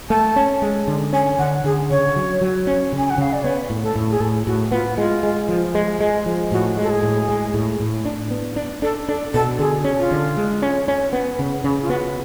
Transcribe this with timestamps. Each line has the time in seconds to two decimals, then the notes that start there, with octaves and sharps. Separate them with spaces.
0.10 A3 A5
0.36 C#4
0.62 G#3
0.88 D3
1.13 C#4 G#5
1.39 D3 F#5
1.64 D3 G#4
1.90 C#3 C#5
2.16 F#3
2.41 F#3
2.67 C#4
2.93 C#3
2.98 G#5
3.10 F#5
3.18 C#3 F5
3.33 D5
3.43 B3 C#5
3.70 A2
3.83 A4
3.96 A2
4.10 G#4
4.20 A2 A4
4.46 A2 F#4
4.72 B3 F4
4.98 G#3 F4
5.23 G#3
5.49 F3
5.75 G#3
6.00 G#3
6.26 F3
6.51 A2 F#4
6.77 G#3
6.82 A4
6.90 G#4
7.03 A2
7.29 G#3
7.54 A2
7.80 A2
8.05 D4
8.31 B3
8.56 D4
8.82 D4 A4
9.08 D4 A4
9.34 B2 A4
9.59 D3 G#4
9.84 C#4
9.98 F4
10.11 D3
10.37 G#3
10.62 C#4
10.88 C#4
11.13 B3
11.39 C#3
11.64 C#3
11.82 F4
11.90 B3 F#4